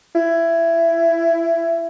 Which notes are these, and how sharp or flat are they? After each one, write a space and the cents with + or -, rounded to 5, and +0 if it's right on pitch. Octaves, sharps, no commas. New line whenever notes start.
E4 +20